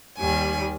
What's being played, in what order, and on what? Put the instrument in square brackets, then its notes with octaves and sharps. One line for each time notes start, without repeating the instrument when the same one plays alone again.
[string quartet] D#2 D#3 G3 G#5